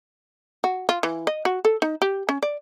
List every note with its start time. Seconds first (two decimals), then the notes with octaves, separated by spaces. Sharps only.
0.64 F#4
0.89 F4
1.03 E3
1.27 D#5
1.45 F#4
1.65 A4
1.82 D#4
2.02 G4
2.29 C#4
2.43 D5